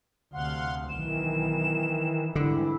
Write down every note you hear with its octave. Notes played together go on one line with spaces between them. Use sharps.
D2 C3 F5 F#5 C6
B1 D#3 E3 E7
G#2 D3 E3 G3 E4